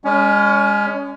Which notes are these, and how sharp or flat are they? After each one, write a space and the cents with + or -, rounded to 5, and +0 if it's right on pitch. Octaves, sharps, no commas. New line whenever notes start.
G#3 -25 C#4 +20